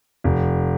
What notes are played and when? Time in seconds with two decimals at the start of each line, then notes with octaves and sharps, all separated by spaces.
0.24 F1